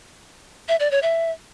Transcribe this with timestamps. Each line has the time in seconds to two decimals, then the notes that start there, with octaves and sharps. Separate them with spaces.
0.69 E5
0.80 D5
0.91 C#5
1.03 E5